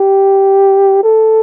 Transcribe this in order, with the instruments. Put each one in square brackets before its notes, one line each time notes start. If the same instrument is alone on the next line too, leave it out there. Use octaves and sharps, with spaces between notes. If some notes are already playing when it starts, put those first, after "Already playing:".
Already playing: [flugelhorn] G4
A4